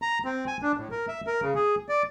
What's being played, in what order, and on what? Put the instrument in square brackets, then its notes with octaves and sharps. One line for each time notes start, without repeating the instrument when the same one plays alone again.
[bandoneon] A#5
C4
G#5
D4
A2
A#4
E5
A#4
C#3
G#4
D5